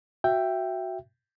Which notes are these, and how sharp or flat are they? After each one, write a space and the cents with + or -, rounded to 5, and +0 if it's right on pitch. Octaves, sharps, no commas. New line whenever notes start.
F#4 +0 E5 +15 G5 +0